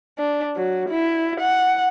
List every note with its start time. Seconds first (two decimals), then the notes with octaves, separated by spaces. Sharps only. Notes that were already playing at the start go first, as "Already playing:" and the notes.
0.19 D4
0.56 F#3
0.90 E4
1.40 F#5